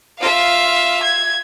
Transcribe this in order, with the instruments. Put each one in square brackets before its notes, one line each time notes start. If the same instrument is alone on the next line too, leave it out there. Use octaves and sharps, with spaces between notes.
[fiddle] F4 E5 [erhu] F5
[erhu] G#6